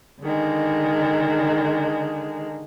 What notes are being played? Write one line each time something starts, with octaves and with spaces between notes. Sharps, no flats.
D3 D#3 G#3